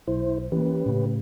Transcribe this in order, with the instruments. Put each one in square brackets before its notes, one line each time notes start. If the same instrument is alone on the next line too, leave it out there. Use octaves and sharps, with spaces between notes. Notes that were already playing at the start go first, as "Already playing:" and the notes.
[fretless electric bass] B1 [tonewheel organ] E4 C5
[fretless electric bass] E3 A#3 [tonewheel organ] C#4 G4 B4
[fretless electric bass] A2 C#3